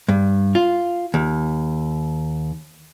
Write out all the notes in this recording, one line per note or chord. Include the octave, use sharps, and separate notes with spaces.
G2
F4
D#2